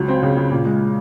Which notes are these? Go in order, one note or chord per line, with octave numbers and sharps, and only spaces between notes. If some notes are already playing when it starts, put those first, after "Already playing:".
Already playing: C#2 F#3
C4
C#3
C#3
A#2
G#3